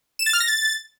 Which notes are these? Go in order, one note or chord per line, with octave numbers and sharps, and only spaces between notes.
E7
A6
F6
A#6
A6